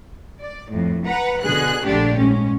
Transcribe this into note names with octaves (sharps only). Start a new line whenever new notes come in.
D5
F2 A2
B4 F#5 A#5
B2 D3 G#4 F#6
A#1 D3 A3 D4 G4
G#2 C#4